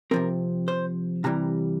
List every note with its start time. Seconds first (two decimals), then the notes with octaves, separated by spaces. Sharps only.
0.11 C3 F3 C4 A#4
0.68 C5
1.24 C3 E3 G3 A#5